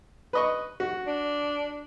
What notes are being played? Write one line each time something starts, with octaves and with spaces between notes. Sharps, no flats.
B4 D#5 C#6
F#4
D4